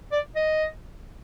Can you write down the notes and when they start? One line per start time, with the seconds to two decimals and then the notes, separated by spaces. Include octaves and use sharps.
0.12 D5
0.36 D#5